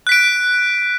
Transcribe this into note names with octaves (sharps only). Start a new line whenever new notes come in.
F#6 B6 D7